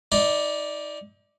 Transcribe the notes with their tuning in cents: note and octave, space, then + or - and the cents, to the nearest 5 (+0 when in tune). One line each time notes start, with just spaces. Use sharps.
D#4 +35 D5 +0 C6 +0